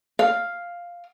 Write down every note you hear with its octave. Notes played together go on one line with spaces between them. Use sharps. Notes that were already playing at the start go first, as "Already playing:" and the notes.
F5